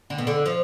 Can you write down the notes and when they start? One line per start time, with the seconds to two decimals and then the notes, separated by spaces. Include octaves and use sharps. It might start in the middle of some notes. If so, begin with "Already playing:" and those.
0.10 D3
0.18 B2
0.27 D3
0.46 F3